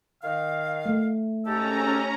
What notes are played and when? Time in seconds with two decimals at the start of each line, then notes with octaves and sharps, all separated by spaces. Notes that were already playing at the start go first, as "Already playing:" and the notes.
0.23 D#3 F5
0.86 A3
1.45 G#2 C#4 G4 A4 A#5